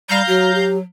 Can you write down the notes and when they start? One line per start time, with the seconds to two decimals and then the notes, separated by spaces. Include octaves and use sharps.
0.09 G3 F5 A#5 G6
0.28 F#3 F#4
0.55 G4